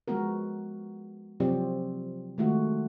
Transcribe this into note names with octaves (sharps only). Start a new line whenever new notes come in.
F3 G#3 B3 F#4 A#4
C3 F3 F#3 C4 G4 D5
D#3 G#3 A3 F4 F#4